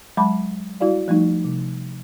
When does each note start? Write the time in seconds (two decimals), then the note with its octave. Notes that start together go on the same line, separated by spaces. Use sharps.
0.17 F#3 G#3 A5 B5 D6
0.80 G3 E4 F#4 D5 F5
1.08 F3 G3 A3 D#4
1.45 C3